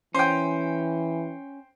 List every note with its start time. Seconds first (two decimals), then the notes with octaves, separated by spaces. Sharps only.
0.14 E3 C#4 C5 G5